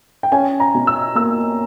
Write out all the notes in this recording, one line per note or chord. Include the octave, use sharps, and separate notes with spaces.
G5
C#4 G#5
A#5
B2
E6
A#3 E6